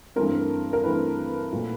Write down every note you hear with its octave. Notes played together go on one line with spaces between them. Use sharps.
G2 E3 A3 C4 A#4
A#4
G2 E3 A3 C4 B4
A#2 F#3 A3